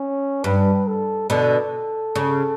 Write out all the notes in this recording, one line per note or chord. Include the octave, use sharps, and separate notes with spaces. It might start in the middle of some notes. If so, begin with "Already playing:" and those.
Already playing: C#4
G2 B4
A4
B2 D3 A4
C#3